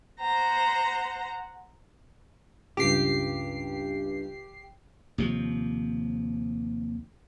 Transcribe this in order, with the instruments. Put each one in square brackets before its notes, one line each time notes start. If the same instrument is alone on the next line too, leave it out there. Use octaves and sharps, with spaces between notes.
[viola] C5 A#5 [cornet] F#5
[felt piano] C#2 G2 [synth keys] G4 C7
[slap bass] D#2 C3 F3